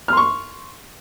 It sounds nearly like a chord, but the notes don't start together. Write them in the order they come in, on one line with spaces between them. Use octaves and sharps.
F6 C6 C#6